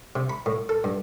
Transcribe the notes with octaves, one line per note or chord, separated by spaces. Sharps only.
C3
B5
A2
A4
G2